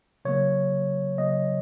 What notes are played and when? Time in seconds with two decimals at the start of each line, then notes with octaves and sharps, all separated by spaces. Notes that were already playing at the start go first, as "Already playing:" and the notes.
0.25 C#3 F#3 A#3 C#5
1.18 C#3 F#3 A#3 D#5